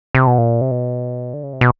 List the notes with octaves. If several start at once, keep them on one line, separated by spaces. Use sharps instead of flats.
C3
B2
A#2
C3
B2
D3
C#3
C3
B2